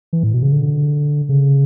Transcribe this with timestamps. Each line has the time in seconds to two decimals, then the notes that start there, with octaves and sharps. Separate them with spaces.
0.13 E3
0.23 A2
0.33 B2
0.43 C#3
0.52 D3
1.29 C#3